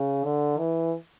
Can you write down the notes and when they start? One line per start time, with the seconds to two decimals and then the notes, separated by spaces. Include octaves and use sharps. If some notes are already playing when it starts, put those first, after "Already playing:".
Already playing: C#3
0.24 D3
0.58 E3